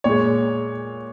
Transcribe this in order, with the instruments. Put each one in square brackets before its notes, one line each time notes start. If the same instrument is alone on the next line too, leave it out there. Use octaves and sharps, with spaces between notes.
[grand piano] A#2 G#3 C#5